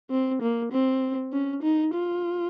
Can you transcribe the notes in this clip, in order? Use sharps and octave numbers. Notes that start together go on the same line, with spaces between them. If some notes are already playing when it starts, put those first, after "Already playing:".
C4
A#3
C4
C#4
D#4
F4